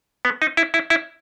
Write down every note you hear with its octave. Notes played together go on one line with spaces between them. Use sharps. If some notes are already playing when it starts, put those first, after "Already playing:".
B3
D#4
E4
E4
E4